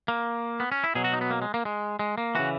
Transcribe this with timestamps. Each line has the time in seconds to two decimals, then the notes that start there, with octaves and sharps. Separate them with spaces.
0.08 A#3
0.60 B3
0.72 C#4
0.84 E4
0.95 B2 F#3 G#4
1.04 F#4
1.13 D#4
1.21 B3
1.30 A#3
1.42 G#3
1.54 A#3
1.65 G#3
1.99 G#3
2.18 A#3
2.35 C#3 E3 F#4